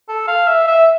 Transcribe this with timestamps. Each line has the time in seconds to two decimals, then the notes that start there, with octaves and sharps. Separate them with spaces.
0.09 A4
0.28 F5
0.48 E5
0.68 E5